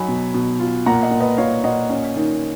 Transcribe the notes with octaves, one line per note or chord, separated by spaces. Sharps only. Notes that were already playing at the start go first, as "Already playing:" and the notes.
Already playing: F#3 D#4 G#5 B5
B2
B2
F4
A#2 F#5 A#5
D#5 F#5
A#2
B4 D#5
A#2 C#5 F5
A#2 D#5 F#5
C#4
D#3